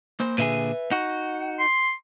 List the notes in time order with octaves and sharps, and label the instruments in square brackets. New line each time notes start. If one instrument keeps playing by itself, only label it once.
[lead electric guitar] A#3 C5
[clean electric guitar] A#2 D3 G#4 [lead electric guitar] B4 E5
[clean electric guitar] D#4 F#4 [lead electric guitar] F#5
[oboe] C6